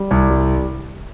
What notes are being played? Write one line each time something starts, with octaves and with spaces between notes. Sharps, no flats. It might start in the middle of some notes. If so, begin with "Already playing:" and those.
Already playing: G3
C2
G3